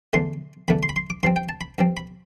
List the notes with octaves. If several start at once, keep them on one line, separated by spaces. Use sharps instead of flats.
E2 D3 A3 C6
E2 D3 A3 B5
C6
B5
C6
D6
G2 F3 C4 C6
G5
A5
B5
G2 F3 C4
B5